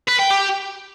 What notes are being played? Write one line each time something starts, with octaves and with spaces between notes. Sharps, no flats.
B4
G5
G4